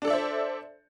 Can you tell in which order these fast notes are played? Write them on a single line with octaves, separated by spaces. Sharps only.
D4 A4 D5 E5 C5